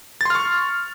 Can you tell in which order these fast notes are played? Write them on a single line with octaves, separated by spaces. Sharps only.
A6 C6 F6 C#6